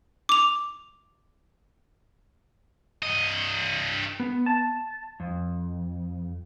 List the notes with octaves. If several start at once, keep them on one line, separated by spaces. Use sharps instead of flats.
D6 F7
G2 D#5
B3
A5
F2